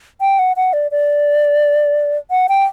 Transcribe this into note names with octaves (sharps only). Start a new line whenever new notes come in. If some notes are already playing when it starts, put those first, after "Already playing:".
G5
F#5
F#5
D5
D5
F#5
G5